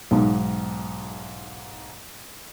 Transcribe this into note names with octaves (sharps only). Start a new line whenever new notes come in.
B1 G#2